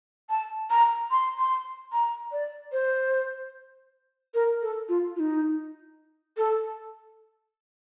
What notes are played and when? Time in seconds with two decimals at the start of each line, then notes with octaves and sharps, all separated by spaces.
0.29 A5
0.70 A#5
1.11 C6
1.38 C6
1.92 A#5
2.32 D5
2.72 C5
4.34 A#4
4.62 A4
4.89 F4
5.16 F4
5.20 D#4
6.37 A4